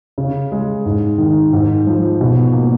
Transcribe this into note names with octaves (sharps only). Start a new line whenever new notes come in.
C#3
G#3
G#2
D#3
G#2
F3
B2
A#3